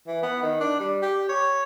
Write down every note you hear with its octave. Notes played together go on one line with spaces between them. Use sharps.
E3
B3
D#3
D4
G3
G4
C#5